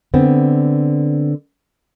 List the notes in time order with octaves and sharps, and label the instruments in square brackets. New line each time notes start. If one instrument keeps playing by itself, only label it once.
[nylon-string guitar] D3 B3 C4